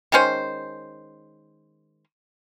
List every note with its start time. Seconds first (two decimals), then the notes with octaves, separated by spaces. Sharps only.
0.12 D#3 G#3 C#4 C5